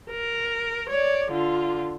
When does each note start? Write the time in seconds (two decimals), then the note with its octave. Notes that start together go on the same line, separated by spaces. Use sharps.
0.10 A#4
0.89 C#5 D5
1.31 D3 F4